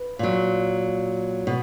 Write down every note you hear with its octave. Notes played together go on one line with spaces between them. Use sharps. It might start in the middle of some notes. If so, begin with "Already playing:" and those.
Already playing: B4
A#2 F#3
B2